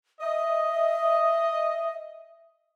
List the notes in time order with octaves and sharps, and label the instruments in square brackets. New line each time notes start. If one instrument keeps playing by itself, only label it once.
[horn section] D#5 [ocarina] E5